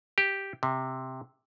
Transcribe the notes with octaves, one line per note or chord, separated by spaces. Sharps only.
G4
C3